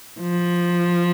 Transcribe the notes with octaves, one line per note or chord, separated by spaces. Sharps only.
F3